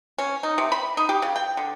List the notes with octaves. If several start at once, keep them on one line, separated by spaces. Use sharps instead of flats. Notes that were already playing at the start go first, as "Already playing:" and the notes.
C#4
D#4
C3
B5
D#4
G4
C#3
G5
D3